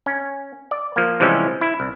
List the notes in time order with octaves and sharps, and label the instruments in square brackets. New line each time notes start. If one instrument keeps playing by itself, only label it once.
[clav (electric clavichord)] C#4
D5
F3 A#3
C3 E3 F3 G3 G#3 C#4
E4
C2